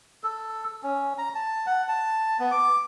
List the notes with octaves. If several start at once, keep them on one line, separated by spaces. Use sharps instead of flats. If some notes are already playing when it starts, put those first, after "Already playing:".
A4
C#4
A#5
A5
F#5
A5
B3
D6